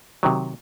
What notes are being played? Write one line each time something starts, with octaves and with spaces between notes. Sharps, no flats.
C3 D#3 F#3